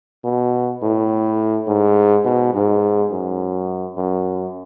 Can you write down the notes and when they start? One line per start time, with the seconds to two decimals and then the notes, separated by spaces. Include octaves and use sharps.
0.24 B2
0.83 A2
1.67 G#2
2.25 B2
2.54 G#2
3.12 F#2
3.97 F#2